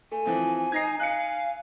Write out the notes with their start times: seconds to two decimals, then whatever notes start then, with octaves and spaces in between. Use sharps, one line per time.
0.12 A3 G#5
0.25 E3 F3 C4
0.72 D#4 G#6 A#6 C7
1.00 F5 F#6 C#7